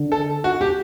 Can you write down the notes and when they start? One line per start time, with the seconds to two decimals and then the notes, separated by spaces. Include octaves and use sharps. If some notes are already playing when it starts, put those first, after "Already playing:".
Already playing: D3
0.12 A4
0.44 F#4
0.61 G4